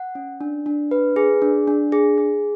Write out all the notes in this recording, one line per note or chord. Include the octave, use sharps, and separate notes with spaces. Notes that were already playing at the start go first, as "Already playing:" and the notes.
Already playing: F#5
C#4
D4
D4
B4
G#4
D4
D4
G#4
G#4